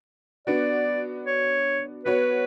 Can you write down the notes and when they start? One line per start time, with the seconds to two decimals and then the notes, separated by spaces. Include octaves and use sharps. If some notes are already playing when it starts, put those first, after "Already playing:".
0.47 B3 D4 F#4 D5
1.26 C#5
2.05 B3 F#4 B4 C#5